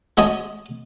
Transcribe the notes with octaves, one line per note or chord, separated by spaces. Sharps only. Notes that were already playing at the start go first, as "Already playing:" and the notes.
G#3 F#4 C#5 D#5 A5